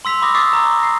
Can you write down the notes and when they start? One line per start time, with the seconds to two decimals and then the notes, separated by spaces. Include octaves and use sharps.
0.05 C6 E6 B6 F7
0.22 B5 D6 D#6 A#6
0.34 C#6 D6 E6 A6 B6 C7
0.53 A#5
0.79 A#6 C7